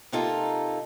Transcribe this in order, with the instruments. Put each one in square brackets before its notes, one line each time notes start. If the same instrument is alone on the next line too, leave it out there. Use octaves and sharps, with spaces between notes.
[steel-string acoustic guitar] C3 A#3 D#4 F4 A4